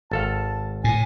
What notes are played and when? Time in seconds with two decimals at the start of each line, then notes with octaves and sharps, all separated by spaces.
0.11 G#1 A4 F5 A5
0.84 A2 G#5